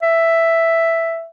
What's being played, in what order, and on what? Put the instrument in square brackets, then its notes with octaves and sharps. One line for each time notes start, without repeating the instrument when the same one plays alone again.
[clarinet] E5